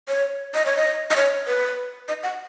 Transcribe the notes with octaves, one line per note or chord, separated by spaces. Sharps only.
C#5
D#5
C#5
D#5
D#5
C#5
B4
D#5
F#5